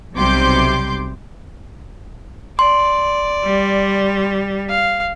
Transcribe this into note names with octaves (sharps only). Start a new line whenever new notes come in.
B1 C3 G3 C6 D6 G6
D5 C6
G3
F5